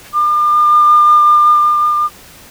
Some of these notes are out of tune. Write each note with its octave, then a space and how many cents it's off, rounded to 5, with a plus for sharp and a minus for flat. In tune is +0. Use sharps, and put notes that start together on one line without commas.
D6 +40